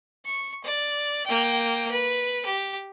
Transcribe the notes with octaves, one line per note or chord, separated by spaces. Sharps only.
C#6
D5
A#3 G5
B4
G4